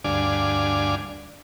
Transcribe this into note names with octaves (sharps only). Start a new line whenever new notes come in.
D2 G2 D4 D5 F5 G#5